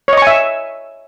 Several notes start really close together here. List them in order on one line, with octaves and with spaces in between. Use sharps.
C#5 D#5 C#6 G#5 E5